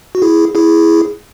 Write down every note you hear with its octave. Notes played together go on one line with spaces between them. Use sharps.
F#4
E4 G#4
E4 G#4